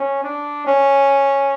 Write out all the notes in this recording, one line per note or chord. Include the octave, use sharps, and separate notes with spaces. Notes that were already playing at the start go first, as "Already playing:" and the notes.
Already playing: C#4
D4
C#4